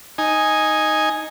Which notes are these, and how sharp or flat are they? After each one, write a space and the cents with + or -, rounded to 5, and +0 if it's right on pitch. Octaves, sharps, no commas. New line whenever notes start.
D#4 +0 G#5 +0